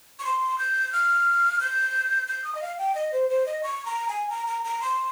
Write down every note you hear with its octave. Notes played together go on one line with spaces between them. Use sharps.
C#6
C6
G6
F6
G6
G6
D#6
D#5
F5
G5
D#5
C5
C5
D#5
C#6
A#5
G#5
A#5
A#5
A#5
C6